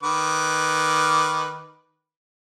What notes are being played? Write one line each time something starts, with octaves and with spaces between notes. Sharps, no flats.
D#3 B4 D6